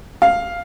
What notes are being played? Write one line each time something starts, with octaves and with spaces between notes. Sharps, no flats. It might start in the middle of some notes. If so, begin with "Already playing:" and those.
F5